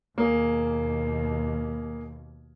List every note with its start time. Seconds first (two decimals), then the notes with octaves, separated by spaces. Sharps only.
0.18 D#2 B2 A#3 G#4